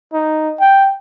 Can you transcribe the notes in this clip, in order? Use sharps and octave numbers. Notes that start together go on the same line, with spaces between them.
D#4
G5